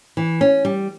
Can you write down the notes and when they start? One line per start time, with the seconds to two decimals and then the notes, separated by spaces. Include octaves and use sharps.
0.17 E3
0.41 C#4
0.65 G3